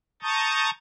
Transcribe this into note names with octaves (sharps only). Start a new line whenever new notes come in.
A5 A#5 C#6 D#6 G6 A6